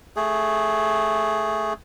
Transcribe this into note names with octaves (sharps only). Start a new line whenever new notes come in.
A3 G#4